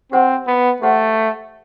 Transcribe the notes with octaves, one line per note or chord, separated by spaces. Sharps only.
C4 G4 C5 F#5 C6
B3
A3 G4 C5 F#5 C6